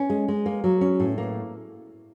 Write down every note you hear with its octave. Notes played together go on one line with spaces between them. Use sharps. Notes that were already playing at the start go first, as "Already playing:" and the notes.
Already playing: C#4
G#3
G#3
A#3
F#3
C#4
A2
A#3